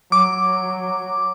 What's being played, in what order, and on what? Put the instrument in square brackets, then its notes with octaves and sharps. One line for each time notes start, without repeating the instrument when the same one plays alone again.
[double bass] F#3 [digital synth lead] D6